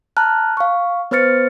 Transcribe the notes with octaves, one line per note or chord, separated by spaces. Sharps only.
A5 A#5 F6 F#6
F5 C#6
B3 B4 C5 F6 A6 C#7